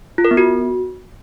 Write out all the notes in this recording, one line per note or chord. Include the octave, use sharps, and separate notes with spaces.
F4
A#4
B3
F#4